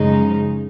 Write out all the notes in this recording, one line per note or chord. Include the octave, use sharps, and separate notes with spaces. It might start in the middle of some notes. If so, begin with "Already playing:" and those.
Already playing: F#2 C#3 F3 G#3 D#4